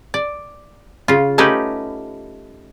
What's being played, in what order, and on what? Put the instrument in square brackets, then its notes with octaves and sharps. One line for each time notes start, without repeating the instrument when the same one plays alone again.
[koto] D5
C#3 F4
A3 C#4 D#4 G4 B4